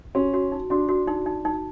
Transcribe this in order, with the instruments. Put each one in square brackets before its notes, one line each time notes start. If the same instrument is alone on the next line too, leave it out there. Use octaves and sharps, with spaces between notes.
[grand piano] C#4 [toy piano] F#4
[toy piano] F#4
D#4
[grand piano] D4 [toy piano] F#4
[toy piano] F#4
D#4
D#4
D#4